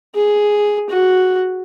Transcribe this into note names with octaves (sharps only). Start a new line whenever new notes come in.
G#4
F#4